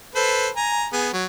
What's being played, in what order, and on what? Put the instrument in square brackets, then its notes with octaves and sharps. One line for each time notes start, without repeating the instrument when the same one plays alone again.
[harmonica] A4 B4 C5
G#5 A#5
B3 G#4
F#3